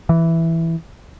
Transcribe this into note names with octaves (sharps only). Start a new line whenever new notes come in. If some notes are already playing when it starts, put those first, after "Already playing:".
E3